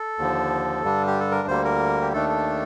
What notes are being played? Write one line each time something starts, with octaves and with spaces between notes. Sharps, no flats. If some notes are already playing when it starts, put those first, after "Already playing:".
Already playing: A4
D#2 D3 F3
G2 D3 G3 D4
G4
A4
A#4
D2 D3 G3 A#3 C5
A#4
G4
D#2 D#3 A3 D4 A4
A4